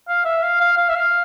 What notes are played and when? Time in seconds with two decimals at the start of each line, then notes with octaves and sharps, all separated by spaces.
0.09 F5
0.25 E5
0.43 F5
0.61 F5
0.78 F5
0.89 E5
0.95 F5